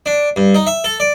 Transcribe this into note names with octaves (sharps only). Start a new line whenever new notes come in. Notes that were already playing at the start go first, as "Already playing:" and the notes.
D4
G2
D#4
E5
A4
D5